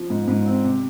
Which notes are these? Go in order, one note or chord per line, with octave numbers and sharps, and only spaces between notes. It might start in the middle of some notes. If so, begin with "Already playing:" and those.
Already playing: F3
G#2
G#2
C4
C3